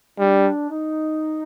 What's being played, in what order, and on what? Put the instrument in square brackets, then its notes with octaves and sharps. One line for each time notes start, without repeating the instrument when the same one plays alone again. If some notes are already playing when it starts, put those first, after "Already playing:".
[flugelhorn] G3 [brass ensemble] D4
[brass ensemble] D#4